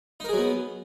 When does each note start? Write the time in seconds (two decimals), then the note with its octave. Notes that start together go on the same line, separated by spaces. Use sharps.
0.20 D#4
0.24 A#4
0.29 G#4
0.33 F#3
0.37 B3